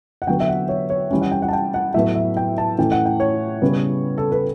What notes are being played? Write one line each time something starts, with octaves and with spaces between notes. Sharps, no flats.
F#5
D3 F#3 B3 G5
E5
F#5
C#5
C#5
E3 G3 C#4
F#5
G5
F#5
A5
G5
F#5
A2 F#3 B3 E5
E5
G5
A5
A2 E3 A3 C#4 G5
F#5
G5
C#5
C#3 G3 B3
A4
B4